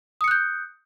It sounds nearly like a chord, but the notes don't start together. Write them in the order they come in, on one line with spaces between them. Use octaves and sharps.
D#6 C#7 F#6 G6